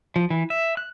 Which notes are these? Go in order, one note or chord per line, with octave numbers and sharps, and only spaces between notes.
F3
E3
E5
F#6